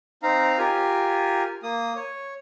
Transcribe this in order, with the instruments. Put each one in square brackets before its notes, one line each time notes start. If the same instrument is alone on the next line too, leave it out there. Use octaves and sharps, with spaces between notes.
[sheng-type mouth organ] C4 D#4 F5 A#5
F4 G4 A#4 G#5
A#3 D#6
C#5